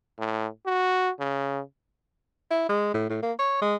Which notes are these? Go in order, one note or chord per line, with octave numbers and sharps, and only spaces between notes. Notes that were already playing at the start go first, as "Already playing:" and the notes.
A2
F#4
C#3
E4
G#3
A2
A2
A#3
C#5
G#3